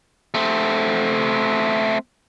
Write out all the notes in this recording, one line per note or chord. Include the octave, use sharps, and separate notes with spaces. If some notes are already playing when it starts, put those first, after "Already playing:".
A3 C4